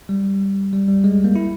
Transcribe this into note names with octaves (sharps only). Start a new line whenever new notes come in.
G3
G3
G3
G#3
A#3
E4